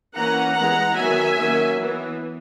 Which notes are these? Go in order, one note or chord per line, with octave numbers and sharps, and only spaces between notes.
E3 A#3 C#4 F#5 A#5
E3 G#3 B3 F#5 A#5
D#3 F#3 B3 E5 G#5
D#3 F#3 A#3 C#4
E3 B3